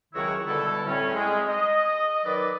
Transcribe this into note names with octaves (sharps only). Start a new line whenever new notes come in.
C#2 D#3 F#3 E4 F#4 C#5
B2 D3 G3 E4 A4
A2 G3 C4 C#4
G#3
D#5
D#3 F#3 B4 D5